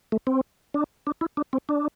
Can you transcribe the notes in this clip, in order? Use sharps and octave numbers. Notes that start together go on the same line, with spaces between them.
A3
C4
D4
D4
E4
D4
C4
D4